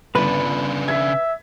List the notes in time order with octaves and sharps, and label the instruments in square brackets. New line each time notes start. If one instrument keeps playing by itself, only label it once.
[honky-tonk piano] G1 [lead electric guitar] C#3 D4 [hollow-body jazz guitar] B4
[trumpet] E5 [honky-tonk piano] G#6 B6